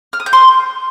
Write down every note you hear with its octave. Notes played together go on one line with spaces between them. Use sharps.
F6
D#6
G6
C6